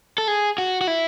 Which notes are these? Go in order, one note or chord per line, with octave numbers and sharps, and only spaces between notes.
A4
G#4
F#4
F#4
E4